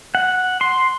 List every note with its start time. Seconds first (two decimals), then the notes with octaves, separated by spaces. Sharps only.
0.15 F#5
0.61 C6